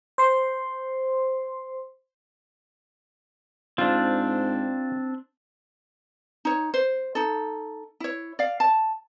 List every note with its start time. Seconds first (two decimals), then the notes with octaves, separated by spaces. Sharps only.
0.18 C5 C6
3.78 G#2 C4 D4 F4
6.45 D#4 C#5
6.74 C5
7.15 D#4 A4
8.00 E4 C#5
8.39 D5 F5
8.60 A5